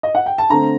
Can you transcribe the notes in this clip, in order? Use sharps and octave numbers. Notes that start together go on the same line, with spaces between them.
D#5
F#5
G5
A5
D3 A3 C4 A#5